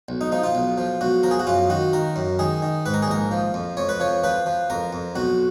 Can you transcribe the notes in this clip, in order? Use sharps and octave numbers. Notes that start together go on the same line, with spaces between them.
B1
D#4
F3 D#4
F4
B1
F3
B1 F#4
F3 A#4
G#4
F#4
F#2 F4
D#3 F#4
D#3 A#4
F#2
D#3 G#4
D#3
G#2 B4
A#4
G#4
A#1 A#4
F3
F2
F2 C#5
B4
F3 C#5
F3 B4
F3
F2 A#4
F2
B1 F#4